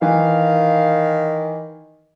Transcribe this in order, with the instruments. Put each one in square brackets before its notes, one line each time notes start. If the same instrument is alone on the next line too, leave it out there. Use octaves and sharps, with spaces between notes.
[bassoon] D#3 [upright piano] E3 [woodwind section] F5